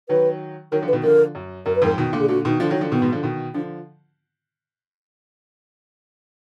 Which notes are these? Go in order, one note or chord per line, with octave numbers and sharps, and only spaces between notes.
D#3 F#3 B4
D#3 F#3 A#4
D3 F3
B4
B2 D#3
D3 F3 A#4
F#2
F#2 A#4
B4
F2 G#2 A#4
B2 D#3
A#2 D3
G#4
A#2 D3 F#4
B2 D#3 D#4
D3 F3 F4
D#3 F#3
D#4
D3 F3
B2 D#3 B3
G#2 B2
D3 F3
B2 D#3
D3 F3 D4